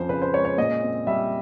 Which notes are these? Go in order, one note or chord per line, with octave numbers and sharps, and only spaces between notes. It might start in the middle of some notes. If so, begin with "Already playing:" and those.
Already playing: F2 F3 C#4 C5
C#3 B4
C5
G#3 C#5
C#5
A#2 D#5
C4
G3 E5